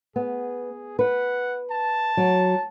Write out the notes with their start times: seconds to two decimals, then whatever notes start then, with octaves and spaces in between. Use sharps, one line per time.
0.16 B3 G#4
0.99 B4 F#5
1.70 A5
2.17 F#3